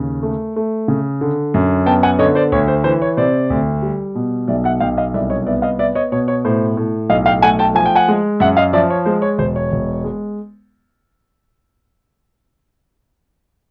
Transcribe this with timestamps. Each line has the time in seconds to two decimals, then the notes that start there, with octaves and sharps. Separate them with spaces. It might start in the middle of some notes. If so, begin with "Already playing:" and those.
Already playing: D#2 C#3
0.23 A3
0.56 A3
0.88 C#3
1.21 D3
1.54 F#2
1.86 B3 G5 A5
2.03 F#5 G#5
2.19 D3 C#5 D#5
2.35 C5 D5
2.52 D2 C#5
2.68 C5
2.84 E3 C5
3.02 C#5
3.17 C3 C5 D5
3.50 D2
3.82 G3
4.15 B2
4.48 B1 D5 E5
4.64 E5 F#5
4.80 B1 F5 G5
4.98 D#5 F5
5.14 C2 D5 E5
5.30 C#5 D#5
5.46 B3 D5 E5
5.62 D#5 F5
5.79 B3 D5 E5
5.95 C#5 D#5
6.12 B2 C#5
6.28 C#5
6.45 A2 C5
6.77 A2
7.09 B1 D#5 F5
7.26 F5 G5
7.42 A3 F#5 G#5
7.59 G5 A5
7.75 F3 G#5
7.86 G5
7.95 F#5 G#5
8.08 G#3
8.40 F#2 E5 F#5
8.57 D#5 F5
8.73 F3 D5 E5
8.90 C#5
9.06 G#3 C5
9.22 C#5
9.38 E1 C5
9.56 C#5
9.72 E1
10.04 G#3